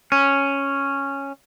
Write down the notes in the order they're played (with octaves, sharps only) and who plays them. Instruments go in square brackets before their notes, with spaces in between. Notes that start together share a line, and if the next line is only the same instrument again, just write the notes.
[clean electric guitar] C#4